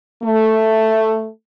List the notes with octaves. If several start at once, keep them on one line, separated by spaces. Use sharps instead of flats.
A3